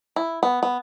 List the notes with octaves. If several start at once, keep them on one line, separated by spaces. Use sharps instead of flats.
E4
B3
B3